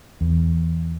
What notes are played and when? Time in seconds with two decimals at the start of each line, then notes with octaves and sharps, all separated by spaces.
0.21 E2